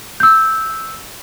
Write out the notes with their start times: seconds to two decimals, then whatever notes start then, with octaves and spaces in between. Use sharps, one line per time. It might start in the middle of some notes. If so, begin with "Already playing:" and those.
0.20 E6 G6